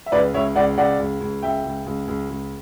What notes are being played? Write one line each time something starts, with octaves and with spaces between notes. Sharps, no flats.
E5
C#2 B4 D5
C#2 C#5 E5
C#2 D5 F#5
C#2 D5 F#5
C#2
C#2
C#2 E5 G5
C#2
C#2
C#2
C#2